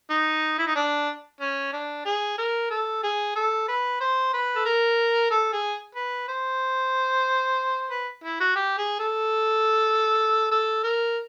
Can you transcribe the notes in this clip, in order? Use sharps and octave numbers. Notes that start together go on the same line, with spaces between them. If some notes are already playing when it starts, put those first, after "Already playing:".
D#4
E4
D#4
D4
C#4
D4
G#4
A#4
A4
G#4
A4
B4
C5
B4
A4
A#4
A4
G#4
B4
C5
B4
E4
F#4
G4
G#4
A4
A4
A#4